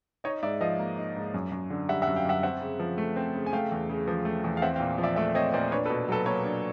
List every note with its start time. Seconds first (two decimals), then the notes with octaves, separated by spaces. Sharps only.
0.24 D#4 C#5 D#5
0.43 G#2 D5 E5
0.61 F3 D#5 F5
0.79 A#3
0.98 D#4
1.16 G#2
1.34 F#2
1.52 F#2
1.70 D3
1.89 G3 E5 F#5
2.02 E5 F#5
2.07 F#2
2.16 F5 G5
2.25 F#2 E5 F#5
2.43 C4 E5 F#5
2.61 C#3
2.80 F3
2.98 A3
3.16 C4
3.34 C#3
3.46 G#5
3.53 A3 F5 G5
3.71 E2
3.89 C#3
4.07 F3
4.25 A3
4.44 E2
4.57 F5
4.62 C4 E5 F#5
4.76 F5 G5
4.80 A#2
4.98 F3
5.03 D5 E5
5.16 A3 D5 E5
5.35 C4 C#5 D#5
5.53 A#2 C5 D5
5.71 D4 B4 C#5
5.86 A4 B4
5.90 B2
6.09 F#3 A4 B4
6.26 A#3 B4 C#5
6.44 D4